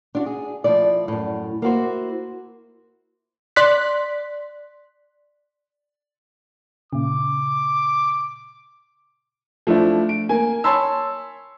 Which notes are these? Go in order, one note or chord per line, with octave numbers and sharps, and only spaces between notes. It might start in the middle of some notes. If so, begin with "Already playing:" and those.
D4 F4 F#4
G#4
F3 A3 E4 D5
F#2 A2
A#3 E4 F#4 C5
D5 C6 F#6 B6
A#2 C#3 D6
F3 A3 D4 E4
D7
A#3 G#5
C#5 G#5 A5 B5 C6 E6